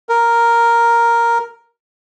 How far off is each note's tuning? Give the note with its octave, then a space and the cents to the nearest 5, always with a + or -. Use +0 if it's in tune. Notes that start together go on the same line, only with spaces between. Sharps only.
A#4 +0